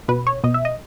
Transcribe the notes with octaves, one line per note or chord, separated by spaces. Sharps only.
B2 B4
C#5
B2 D#5
E5
D#5